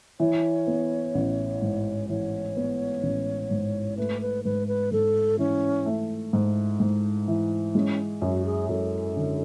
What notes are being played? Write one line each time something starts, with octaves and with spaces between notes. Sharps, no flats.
E3 C#5
B3
A1
G#2
E3 C#5
B3
A1
G#2
A3 B4
B4
G#2 B4
B4
G#2 A4
E3 C#4
A3
G#2
G#2
E3
G#3 C#4
F#2 F#4
G#4
F#2 A4
D3